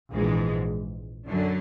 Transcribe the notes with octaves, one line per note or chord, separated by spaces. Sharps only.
A#1 G#2 E3 G#3
F#2 D3 F#3